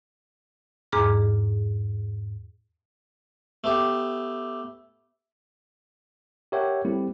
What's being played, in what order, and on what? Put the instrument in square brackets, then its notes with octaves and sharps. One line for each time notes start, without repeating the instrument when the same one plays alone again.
[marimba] E2 G#2 G#4 A#5 D6 F6
[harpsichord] A3 B3 G4
[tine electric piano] G4 A#4 C#5 E5 F#5 G5
G3 A3 C4 E4 G4